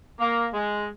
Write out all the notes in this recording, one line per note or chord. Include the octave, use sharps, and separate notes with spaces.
A#3
G#3